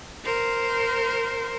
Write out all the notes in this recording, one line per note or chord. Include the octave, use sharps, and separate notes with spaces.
A#4 C5